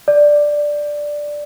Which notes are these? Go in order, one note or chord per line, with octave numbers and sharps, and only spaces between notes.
D5